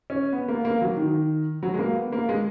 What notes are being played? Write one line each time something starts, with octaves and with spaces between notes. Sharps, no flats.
C#4
B3
A#3
A#3
F#3
D#3
F#3
G#3
A#3
B3
A#3
G#3